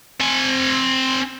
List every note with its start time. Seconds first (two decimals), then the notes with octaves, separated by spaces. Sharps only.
0.21 C4 G#5